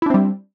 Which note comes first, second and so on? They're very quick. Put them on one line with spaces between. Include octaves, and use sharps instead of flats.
E4 D4 C4 G3